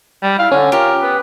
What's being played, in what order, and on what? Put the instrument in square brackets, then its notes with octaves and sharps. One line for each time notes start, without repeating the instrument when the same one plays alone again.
[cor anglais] G3
[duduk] E4 [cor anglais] F5
[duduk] D3 [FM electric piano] C#4 [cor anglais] G#5
[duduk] F4 [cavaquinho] G4 [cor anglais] A#4
[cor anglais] B3 [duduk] B4